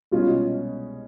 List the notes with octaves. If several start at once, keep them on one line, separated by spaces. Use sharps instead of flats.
C2 B2 G#3 C#4 F4